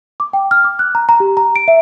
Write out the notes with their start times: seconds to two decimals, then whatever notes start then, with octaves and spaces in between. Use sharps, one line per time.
0.20 D6
0.33 G5
0.51 F6
0.64 D6
0.79 F#6
0.95 A#5
1.09 A#5
1.20 G4
1.37 A#5
1.56 D7
1.68 E5